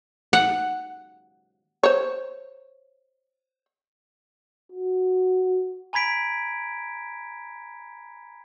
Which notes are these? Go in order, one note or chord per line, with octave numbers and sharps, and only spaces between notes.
F#5
C5 C#5
F#4
G#5 A#5 B5 G#6 B6 D7